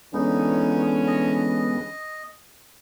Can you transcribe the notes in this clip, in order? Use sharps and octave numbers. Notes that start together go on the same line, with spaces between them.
D3 E3 G#3 B3 C#4 D#4
D#5